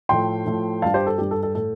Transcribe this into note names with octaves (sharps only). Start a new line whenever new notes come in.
A2 F3 A3 G5 C6
A2 F3 A3
G2 G3 F5 A5
G4 C5
A4
G2 G3 G4
A4
A4
A2 A3 A4